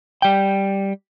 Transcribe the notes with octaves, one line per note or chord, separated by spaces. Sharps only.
G3 G5